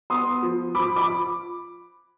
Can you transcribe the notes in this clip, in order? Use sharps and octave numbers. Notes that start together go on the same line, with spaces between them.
B3 C6 D#6
F3
F3 B5 D6
B5 D6